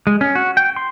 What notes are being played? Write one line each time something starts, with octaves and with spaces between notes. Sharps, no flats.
G#3
C#4
F#4
G5
C6